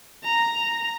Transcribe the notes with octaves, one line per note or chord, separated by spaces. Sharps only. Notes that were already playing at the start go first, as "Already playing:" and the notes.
A#5